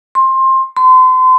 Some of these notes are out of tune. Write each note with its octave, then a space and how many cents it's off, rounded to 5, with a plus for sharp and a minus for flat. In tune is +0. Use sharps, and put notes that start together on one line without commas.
C6 +20
C6 -35